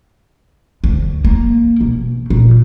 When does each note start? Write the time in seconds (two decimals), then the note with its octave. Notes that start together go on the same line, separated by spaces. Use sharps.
0.84 D2
1.25 A#3
1.81 B2
2.30 A#2